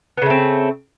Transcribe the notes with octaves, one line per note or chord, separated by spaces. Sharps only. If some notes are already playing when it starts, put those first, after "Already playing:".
C#3 A3 B3 C4